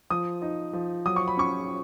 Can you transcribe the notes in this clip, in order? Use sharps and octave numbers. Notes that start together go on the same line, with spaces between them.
F3 D#6
D#4
F3
F#3 D#6
C#6
B5
C#4 C#6